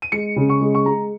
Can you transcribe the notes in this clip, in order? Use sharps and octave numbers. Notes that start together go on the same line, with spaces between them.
D#7
G#3 C#7
C#3
C#6
G#3
C#6
G#3 A#5